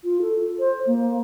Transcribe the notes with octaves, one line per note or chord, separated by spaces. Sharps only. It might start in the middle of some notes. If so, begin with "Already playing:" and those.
F4
A4
C5
A#3